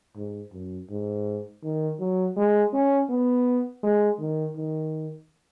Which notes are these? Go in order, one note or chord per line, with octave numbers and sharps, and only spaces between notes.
G#2
F#2
G#2
D#3
F#3
G#3
C#4
B3
G#3
D#3
D#3